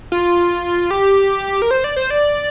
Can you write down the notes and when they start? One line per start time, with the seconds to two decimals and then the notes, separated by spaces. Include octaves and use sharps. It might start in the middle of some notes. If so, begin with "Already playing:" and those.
0.12 F4
0.91 G4
1.62 A#4
1.71 C5
1.84 D5
1.96 C5
2.10 D5